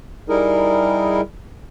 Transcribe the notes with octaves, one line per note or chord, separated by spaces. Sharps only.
G3 D#4 E4 G#4 A#4